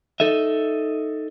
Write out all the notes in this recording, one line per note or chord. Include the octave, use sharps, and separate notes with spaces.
D#4 A4 D#5 E5